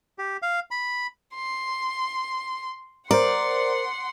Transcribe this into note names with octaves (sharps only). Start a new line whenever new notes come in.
G4
F5
B5
C6
A#4 C5 D5 F#5 C6